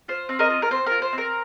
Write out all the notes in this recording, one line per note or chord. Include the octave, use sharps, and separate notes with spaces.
F4 C5
C4
A#4 D#5
F4
A#4
C4 C5
F4 A#4
C5
C4
A#4